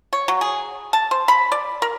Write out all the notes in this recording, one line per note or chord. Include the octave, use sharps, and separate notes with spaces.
C#5
F#3
G#4
A5
C5
B5
D5
A#4